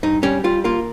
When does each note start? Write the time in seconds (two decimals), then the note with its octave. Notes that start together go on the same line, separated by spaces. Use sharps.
0.03 G2 D#4
0.23 G3 C#4
0.44 G3 F4
0.64 A#3 F4